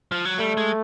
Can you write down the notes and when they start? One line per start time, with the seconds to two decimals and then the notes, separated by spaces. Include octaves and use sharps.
0.12 F3
0.25 F#3
0.38 G3 A3
0.57 G#3